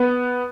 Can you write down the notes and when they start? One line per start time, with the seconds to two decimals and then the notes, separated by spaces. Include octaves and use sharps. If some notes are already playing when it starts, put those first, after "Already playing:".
Already playing: B3